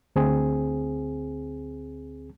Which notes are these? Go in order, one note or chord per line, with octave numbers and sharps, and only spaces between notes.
D2 C4 G#4